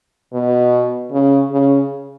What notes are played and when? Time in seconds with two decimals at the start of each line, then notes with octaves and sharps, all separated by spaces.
0.33 B2
1.11 C#3
1.51 C#3